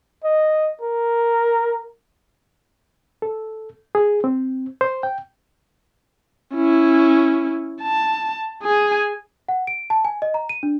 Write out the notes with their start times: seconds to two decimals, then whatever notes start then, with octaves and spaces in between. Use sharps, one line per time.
0.24 D#5
0.81 A#4
3.22 A4
3.95 G#4
4.24 C4
4.81 C5
5.03 G5
6.55 C#4 E4
7.83 A5
8.63 G#4 G#5
9.49 F#5
9.67 D7
9.90 A5
10.05 G#5
10.22 D#5
10.34 A#5
10.49 D#7
10.63 D4